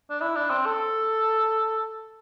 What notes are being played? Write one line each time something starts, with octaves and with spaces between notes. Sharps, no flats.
D4
E4
D4
C4
A4